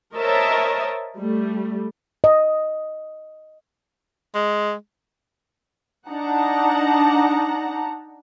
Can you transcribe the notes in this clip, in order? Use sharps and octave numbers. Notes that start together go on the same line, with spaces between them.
A#4 C5 C#5 D#5 E5 A5
G3 A3
D#5
G#3
D4 D#4 F#5 A5 A#5